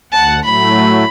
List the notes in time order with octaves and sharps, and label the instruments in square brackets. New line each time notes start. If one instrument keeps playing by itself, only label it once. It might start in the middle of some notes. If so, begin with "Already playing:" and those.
[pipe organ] D2 F#5 [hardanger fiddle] A5
[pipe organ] A2 F#3 A3 [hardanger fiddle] B5